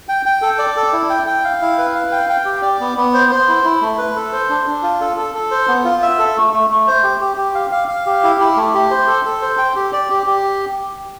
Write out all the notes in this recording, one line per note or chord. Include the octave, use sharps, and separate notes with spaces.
G5
G5
A4
D5
A4
E4
G5
G5
F5
E4
B4
F5
G5
G5
G4
D5
B3
B3
C5
C5
E4
E4
A3
B4
A4
C5
D4
D4
F4
A4
A4
A4
C5
B3
F4
E5
A4
A3
A3
A3
C5
G4
G4
G4
F5
F5
F5
G4
E4
E4
A3
G4
C5
A4
A4
C5
G5
G4
D5
G4
G4